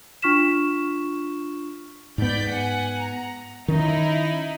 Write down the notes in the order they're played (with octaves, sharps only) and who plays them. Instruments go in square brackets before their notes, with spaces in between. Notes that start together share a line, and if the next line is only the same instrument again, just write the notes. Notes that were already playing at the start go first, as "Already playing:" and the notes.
[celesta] D4 F4 C#6 F6 B6 E7
[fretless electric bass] G#2 B3 [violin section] D5 G6 B6
[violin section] F#5 G#5
A#5
[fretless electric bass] D#3 C#4 [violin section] D#4 E4